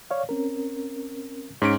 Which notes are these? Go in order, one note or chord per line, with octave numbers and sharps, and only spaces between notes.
C#5 D5 F5
C4 C#4 A#4
G#2 C#4 C#5 D7